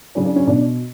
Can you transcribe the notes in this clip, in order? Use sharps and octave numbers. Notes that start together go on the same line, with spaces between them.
C#3 F#3 D4
D4
C#4
B2 D4